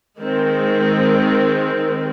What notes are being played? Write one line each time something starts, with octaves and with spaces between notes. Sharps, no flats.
D#3 G#3 C4